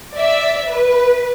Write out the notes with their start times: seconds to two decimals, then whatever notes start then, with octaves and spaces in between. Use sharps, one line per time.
0.15 D5 E5
0.68 B4